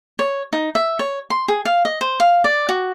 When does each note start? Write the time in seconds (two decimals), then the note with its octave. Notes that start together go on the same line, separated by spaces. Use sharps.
0.19 C#5
0.53 D#4
0.75 E5
0.99 C#5
1.30 C6
1.48 G#4
1.65 F5
1.85 D#5
2.01 C5
2.20 F5
2.44 D5
2.69 F#4